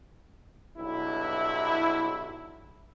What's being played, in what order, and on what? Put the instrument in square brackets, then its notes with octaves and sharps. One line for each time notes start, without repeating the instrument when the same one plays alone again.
[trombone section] B1 G2 E4